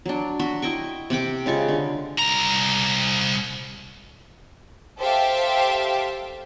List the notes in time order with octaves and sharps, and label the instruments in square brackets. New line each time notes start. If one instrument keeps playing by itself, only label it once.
[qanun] F#3 D4
F#4 E5 C6
E4 D#5 G5 C#6
C3 F#5 G5 D6
C#3 G#3 F4 C#6
D3
[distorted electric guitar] C2 A#5
[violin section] G4 A4 C5 E5 F5 G5